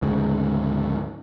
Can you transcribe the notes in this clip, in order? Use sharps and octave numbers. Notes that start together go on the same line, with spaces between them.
D2 G#2 C#3